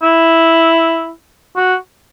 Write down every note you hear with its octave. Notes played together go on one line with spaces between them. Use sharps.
E4
F#4